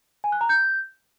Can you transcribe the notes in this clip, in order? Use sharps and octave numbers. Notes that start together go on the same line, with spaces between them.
G#5
F#6
A#5
G6